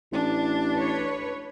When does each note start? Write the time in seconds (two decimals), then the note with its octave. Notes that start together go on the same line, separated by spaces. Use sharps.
0.12 A1 D4
0.74 B4 C#5